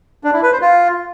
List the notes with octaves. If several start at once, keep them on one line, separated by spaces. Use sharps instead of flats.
D4
E4
B4
C5
F4